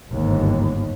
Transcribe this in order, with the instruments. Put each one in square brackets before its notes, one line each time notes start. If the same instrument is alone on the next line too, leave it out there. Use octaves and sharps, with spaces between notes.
[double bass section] G1 D#2 G#2